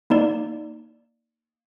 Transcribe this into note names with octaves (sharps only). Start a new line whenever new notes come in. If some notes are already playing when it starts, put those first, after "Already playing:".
A#3 D#4 D5